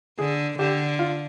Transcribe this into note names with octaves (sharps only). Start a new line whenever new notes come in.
D3 G#4
D3 G4
F4